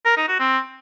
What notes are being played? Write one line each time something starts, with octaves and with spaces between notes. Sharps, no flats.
A#4
D#4
F#4
C4